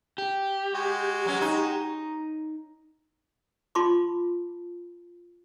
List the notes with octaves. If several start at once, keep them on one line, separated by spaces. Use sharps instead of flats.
G4
G#3 F#4
F#3 C#4
D#4
F4 A5 B5 C6 D6